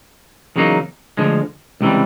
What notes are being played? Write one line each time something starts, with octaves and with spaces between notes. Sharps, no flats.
E2 C#3 F#3 A#3 D#4
D2 D3 F3 G#3
C#2 C3 E3 G3